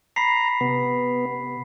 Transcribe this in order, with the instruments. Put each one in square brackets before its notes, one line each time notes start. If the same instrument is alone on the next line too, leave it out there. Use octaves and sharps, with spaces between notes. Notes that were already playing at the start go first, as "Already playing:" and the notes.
[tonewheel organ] A#5 [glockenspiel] B5 B6 C7
[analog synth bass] C3 [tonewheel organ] B3